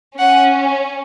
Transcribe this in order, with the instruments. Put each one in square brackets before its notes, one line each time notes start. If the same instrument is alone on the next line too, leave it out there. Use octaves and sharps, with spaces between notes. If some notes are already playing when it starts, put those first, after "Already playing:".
[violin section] C#4 [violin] F#5